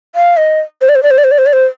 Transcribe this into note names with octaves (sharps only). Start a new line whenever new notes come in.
F5
D#5
C5
D5
C5
D5
C5
D5
C5
D5
C5
D5
C5